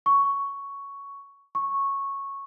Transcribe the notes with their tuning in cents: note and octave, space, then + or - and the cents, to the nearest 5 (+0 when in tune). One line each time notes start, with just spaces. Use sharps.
C#6 +5
C#6 -10